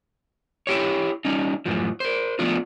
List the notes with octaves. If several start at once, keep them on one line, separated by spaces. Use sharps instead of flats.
E4 G4 C#5
G3 C#4 D#4
F#2 A2 E3 F3
A#4 C5
F3 A3 B3 D4 F4